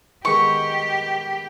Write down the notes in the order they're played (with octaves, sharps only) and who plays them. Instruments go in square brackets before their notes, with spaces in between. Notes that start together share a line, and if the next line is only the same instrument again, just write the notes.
[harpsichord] D#3 G#3 B3 [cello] G4 [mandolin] C#6